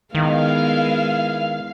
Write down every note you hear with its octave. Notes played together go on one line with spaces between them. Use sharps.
D#3 G#3 B3 E4 F5